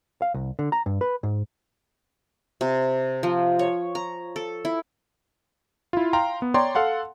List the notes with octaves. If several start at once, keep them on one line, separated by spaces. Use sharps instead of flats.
F5
C2
D3
A#5
G2
B4
G#2
C3
F3
C#5
A#5
A4
E4
E4 F4
F5 G5 A#5 C6
B3
C#5 D5 G5 A#5 C6
A4 F5 F#5 C6